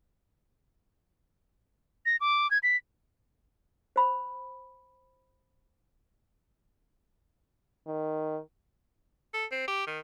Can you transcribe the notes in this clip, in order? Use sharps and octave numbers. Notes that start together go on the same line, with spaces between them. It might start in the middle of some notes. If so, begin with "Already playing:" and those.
A#6
D6
G#6
B6
C5 B5
D#3
A4
C4
G4
D#3